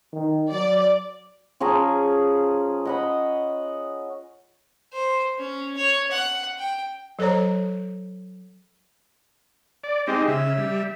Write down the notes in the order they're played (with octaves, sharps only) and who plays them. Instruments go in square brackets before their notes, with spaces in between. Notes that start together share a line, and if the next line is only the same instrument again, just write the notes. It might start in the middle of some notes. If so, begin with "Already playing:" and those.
[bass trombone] D#3
[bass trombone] F#3 [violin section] D5
[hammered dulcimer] F3 C#4 G#4 A#5
D#5 F#5 B5
[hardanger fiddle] C5
C#4
C#5
F#5
G5
[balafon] F#3 A4 C5 C#5 A#5
[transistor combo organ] D5
[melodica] G#3 G4 [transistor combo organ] C4 D#4
[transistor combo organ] C#3 [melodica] E5
[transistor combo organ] G3